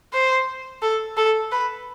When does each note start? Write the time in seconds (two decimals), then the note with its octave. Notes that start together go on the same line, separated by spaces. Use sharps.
0.13 C5
0.82 A4
1.17 A4
1.51 B4